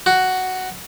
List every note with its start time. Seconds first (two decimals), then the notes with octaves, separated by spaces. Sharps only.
0.06 F#4